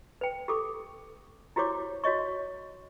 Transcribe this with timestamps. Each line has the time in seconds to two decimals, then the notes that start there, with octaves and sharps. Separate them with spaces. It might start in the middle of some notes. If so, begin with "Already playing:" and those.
0.21 B4 G5
0.48 G4 A4 D6
1.56 E4 F#4 G4 C5 C#5 D6
2.04 F#4 C#5 D#5 C#6